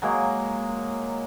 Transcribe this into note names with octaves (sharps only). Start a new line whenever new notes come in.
F#3 G#3 A#3